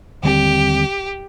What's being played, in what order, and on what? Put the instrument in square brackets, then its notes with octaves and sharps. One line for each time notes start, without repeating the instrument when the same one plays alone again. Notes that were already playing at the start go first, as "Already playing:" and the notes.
[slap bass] D#2 D3 G3 C4 [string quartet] G4